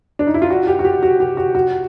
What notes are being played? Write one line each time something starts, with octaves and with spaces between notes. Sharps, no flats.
D4
D#4
E4
F4
F#4
G4
F#4
G4
F#4
G4
F#4
F#4